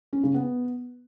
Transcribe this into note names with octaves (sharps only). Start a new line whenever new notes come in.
C#4
C#3
B3